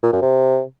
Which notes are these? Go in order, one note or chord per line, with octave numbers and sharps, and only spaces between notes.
A#2
F#2
C3